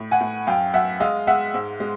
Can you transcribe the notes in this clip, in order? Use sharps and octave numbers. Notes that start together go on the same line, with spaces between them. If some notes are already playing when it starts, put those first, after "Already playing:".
Already playing: A2
F#5 G#5
A2
F#2 F5 G5
F#2 E5 F#5
G#3 D#5 F5
G#3 E5 F#5
G#2
G#3